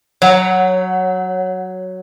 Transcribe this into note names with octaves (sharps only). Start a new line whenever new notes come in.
F#3 C#5 F#5